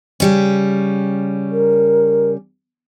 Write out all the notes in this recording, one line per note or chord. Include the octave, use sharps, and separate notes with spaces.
C#3 G3 C#4
A#4